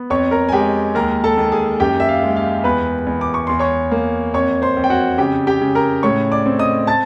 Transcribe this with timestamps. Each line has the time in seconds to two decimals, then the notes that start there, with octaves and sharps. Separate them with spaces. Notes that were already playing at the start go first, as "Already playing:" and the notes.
Already playing: B3
0.10 F2 C#5 C#6
0.31 A#4 A#5
0.48 G#5
0.52 G#3 G4 G5
0.95 D#2 A#4 A#5
1.24 A4 A5
1.37 D#2
1.52 G#4 G#5
1.80 F#2 G4 G5
2.00 E5
2.09 F5
2.23 G#3
2.36 F5
2.64 E2 B4 B5
3.07 E2
3.21 D6
3.34 C#6
3.47 E2 C6
3.59 C#5 C#6
3.91 A#3
4.34 F2 C#5 C#6
4.62 C5 C6
4.77 F2
4.84 G5
4.90 F#4 F#5
5.18 C#3 G4 G5
5.47 G4 G5
5.61 C#3
5.75 A#4 A#5
6.03 A2 C#5 C#6
6.32 D5 D6
6.46 C4
6.59 D#5 D#6
6.87 A5 A6